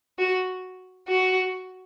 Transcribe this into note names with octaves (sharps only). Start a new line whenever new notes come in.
F#4
F#4